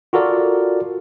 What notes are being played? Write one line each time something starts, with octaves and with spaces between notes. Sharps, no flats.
F4 F#4 A4 A#4 D5